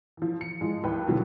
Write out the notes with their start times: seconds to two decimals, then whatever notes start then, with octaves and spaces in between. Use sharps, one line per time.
0.17 E3 F3
0.41 C#7
0.61 F3 G#3
0.84 D#2 A2 B4 G5
1.08 B2 D3 F3 F#3 B3